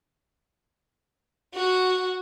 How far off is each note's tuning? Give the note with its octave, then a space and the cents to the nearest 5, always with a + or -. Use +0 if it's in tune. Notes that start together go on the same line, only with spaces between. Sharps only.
F#4 -5